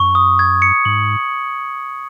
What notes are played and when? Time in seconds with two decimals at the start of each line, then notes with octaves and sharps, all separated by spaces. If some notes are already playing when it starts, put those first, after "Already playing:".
Already playing: F#2 C#6
0.15 D#6
0.39 G#6
0.62 C#7
0.85 G#2 F#7